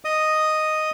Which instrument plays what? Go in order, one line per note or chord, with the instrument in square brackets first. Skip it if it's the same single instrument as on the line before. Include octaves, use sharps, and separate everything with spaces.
[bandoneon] D#5 D#6